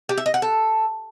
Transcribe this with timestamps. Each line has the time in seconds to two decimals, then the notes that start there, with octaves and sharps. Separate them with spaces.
0.09 G4
0.17 E5
0.26 D#5
0.34 F#5
0.42 A4